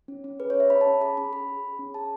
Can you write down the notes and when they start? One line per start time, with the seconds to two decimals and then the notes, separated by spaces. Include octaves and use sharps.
0.08 C#4
0.24 C#4
0.40 G#4 B4
0.50 C#5
0.55 C#4
0.60 E5
0.70 C#4 B5
0.81 A5
0.86 C#4
1.01 G#4 B5
1.17 C#4 B5
1.32 G#4 B5
1.48 G#4
1.64 G#4
1.79 C#4
1.94 G#4 A5